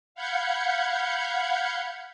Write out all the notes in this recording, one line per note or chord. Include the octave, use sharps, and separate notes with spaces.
F5 F#5 B5 G6 G#6 C#7